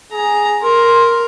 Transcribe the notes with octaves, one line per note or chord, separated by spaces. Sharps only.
G#4 A#5
A#4 C6